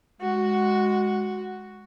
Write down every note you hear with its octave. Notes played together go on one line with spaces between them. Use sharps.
G#3 F#4